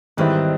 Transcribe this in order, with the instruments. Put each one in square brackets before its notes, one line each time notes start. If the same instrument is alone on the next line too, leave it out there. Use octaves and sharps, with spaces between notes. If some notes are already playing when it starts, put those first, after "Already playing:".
[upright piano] G#2 E3 G3 C4 E4 [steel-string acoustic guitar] D#3